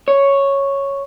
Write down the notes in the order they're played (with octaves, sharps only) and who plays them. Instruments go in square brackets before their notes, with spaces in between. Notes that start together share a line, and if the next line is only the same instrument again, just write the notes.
[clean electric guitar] C#5